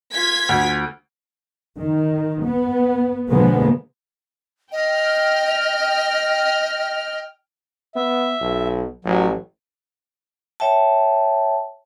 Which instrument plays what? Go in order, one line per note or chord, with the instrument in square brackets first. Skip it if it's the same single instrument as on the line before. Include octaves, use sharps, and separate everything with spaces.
[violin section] F4 G#6 B6
[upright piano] D2
[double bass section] D#3
B3
B2 D3 F3 G#3 A#3 B3
[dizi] D#5 [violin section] G5 F6
[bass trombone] B3 [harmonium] E5
[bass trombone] B1
[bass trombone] A1 [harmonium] F#3
[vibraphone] C#5 E5 G5 A5